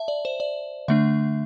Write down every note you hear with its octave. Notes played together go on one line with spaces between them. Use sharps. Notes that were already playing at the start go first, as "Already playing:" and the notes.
Already playing: E5 A5
D5
C5
D5
D3 A3 D4 E5